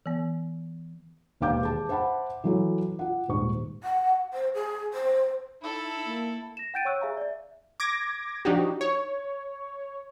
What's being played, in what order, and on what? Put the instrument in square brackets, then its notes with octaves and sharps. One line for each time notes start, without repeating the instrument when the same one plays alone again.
[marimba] E3 B3
[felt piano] E1 D#2 F5 D6 G6
G#4 A5
C5 E5 F#5 A5 B5
E3 F#3 A4
F4 F#5
D#1 G#2 C#6
[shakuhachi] F#5
C5
G#4
C5
[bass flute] D#4 [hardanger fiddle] E4 A4
[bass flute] A#3
[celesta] A#6 E7
F#5 G5 G6 A6 D7 D#7
C#5 C#6 E6 F#6
G#4 E5 F5 G#5 A#5
D5 E5
[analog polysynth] D6 G#6 A#6
F3 D4 D#4 F#4 G4
C#5